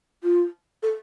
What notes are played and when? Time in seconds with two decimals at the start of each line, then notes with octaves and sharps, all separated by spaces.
0.23 F4
0.83 A4